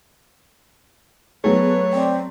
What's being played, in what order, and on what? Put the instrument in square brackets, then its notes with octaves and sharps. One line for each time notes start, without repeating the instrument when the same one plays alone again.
[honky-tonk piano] F#3 A3 [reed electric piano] B3 G#4 [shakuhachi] B4 [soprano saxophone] C#5
[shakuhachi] C4 [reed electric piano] D5 G5